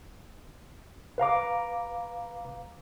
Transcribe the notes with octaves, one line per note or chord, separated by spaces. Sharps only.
B4 F5 A#5 D6